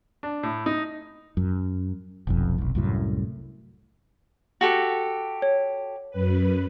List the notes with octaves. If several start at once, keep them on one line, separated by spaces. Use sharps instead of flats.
D4
A2
D#4
F#2
F1 B1 F2
F1 B1
C2 F#2 A2
F#4 G4 A4
C#5
F#2 B4